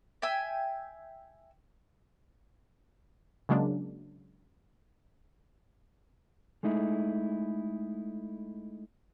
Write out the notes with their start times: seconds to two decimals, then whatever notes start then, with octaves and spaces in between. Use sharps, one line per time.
0.22 E5 G5 G#5 E6
3.49 C#3 F#3 G#3 A#3 D4
6.63 G#3 A3 D#4 E4